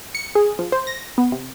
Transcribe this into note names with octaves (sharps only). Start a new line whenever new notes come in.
C#7
G#4
F3
C5
A#6
B3
C3